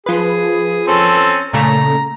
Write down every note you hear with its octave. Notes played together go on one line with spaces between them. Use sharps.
F3 G#4 B4
C4 C#4 A4
A#2 C#3 A3 A#5